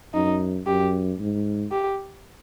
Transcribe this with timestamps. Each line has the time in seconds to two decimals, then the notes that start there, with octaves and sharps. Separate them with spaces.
0.14 F#2 D#4
0.67 F#2 G4
1.19 G#2
1.71 G4